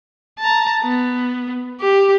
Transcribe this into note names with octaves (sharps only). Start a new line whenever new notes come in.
A5 A#5
B3
G4